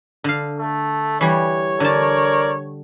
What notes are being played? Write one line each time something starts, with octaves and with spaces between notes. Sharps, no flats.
D3 F5
A3
E3 G3 C#5
D3 A#4 D5 A5